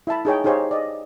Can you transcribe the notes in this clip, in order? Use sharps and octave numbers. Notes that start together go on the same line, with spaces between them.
E4 E5 A5 B5
D#4 G#4 C#5 G5
D#4 G4 G#4 C5 C#5 F5
D5 D#5